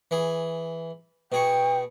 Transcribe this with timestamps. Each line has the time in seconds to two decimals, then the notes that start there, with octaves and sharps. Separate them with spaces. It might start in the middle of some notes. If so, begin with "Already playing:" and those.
0.11 E3 G#4
1.32 B2 G#4 G5 C#6